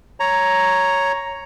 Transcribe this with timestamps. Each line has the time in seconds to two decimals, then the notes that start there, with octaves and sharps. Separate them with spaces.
0.20 C#5 A#5